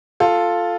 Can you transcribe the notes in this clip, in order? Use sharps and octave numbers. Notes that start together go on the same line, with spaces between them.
F4 A4